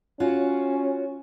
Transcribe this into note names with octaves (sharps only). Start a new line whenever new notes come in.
C#4 F4 F#4 C#5